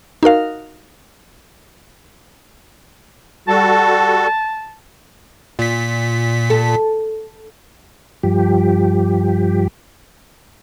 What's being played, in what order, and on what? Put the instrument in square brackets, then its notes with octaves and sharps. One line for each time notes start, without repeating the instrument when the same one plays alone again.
[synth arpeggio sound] D#4 F#4 A#4 F5
[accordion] G3 F#4 A4 [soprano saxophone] A5
[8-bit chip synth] A#2 B6
[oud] A4
[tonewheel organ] G2 F3 G4